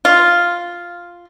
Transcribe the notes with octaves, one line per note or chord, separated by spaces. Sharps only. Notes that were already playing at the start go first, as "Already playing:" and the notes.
F4